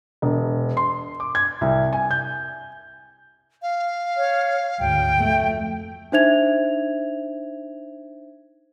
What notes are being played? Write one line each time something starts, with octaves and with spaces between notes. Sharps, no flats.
E1
C6
D6
G#6
C2
G#5
G6
F5
C#5
D2 G#2 G5
F2 A3
D4 D#4 C5 E5 G#6 F7